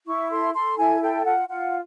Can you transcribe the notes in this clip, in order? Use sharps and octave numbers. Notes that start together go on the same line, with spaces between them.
E4 C#6
A4 C6
A4 C6
E4 G#5
A4 G5
F4 F#5
F4 F#5